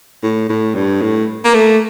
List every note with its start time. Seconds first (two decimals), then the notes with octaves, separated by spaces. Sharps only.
0.23 A2
0.49 A2
0.75 G2
1.01 A2
1.44 A#3
1.54 A3